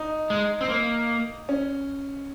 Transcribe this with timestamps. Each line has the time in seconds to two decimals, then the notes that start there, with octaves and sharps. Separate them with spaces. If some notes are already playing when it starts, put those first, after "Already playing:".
Already playing: D#4
0.30 G#3
0.61 C4
0.69 A#3
1.49 C#4